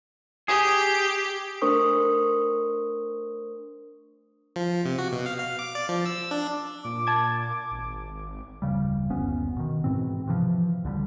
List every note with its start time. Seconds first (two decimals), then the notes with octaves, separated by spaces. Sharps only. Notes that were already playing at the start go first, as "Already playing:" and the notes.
0.48 G4 G#4
1.62 A3 D4 A#4 C5 C#6 D#6
4.56 F3
4.85 C3
4.98 F#4
5.13 B2
5.26 F5
5.38 F5
5.59 D6
5.75 D5
5.89 F3
6.06 E6
6.31 D4
6.85 A#2 D6
7.07 A5 G#6
7.71 G#1
8.62 D1 F2 C#3 G3
9.10 F#1 D2 B3 C#4
9.57 B2 D#3
9.84 G#2 B2 E3 C4
10.27 C3 E3 F3
10.84 C#2 D3 F3 G3